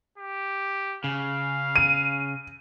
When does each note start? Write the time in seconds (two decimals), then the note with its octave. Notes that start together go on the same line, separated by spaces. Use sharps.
0.18 G4
1.04 C#3 F5
1.76 D#7